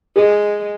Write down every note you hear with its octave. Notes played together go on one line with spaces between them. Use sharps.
G#3 G#4